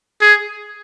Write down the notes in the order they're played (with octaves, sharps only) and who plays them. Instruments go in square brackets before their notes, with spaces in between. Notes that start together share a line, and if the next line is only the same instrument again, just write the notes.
[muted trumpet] G#4